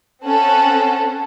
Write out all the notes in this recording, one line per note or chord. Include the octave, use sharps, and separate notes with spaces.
C4 C#4 A4 F#5